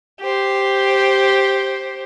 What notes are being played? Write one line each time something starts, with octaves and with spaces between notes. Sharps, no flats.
G4 C5